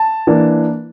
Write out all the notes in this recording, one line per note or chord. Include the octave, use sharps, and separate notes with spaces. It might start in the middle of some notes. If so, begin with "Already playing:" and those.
Already playing: A5
E3 A#3 D4